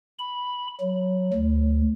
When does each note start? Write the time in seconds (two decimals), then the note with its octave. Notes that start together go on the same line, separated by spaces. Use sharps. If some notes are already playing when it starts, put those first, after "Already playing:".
0.19 B5
0.81 F#3
1.33 D2